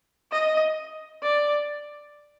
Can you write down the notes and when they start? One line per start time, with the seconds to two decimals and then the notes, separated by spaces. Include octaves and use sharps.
0.32 D#5
1.22 D5